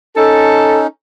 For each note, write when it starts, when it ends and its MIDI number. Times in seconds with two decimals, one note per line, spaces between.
0.16 0.87 61
0.16 0.87 63
0.16 0.81 69